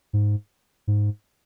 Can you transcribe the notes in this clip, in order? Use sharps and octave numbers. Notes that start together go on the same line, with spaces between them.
G#2
G#2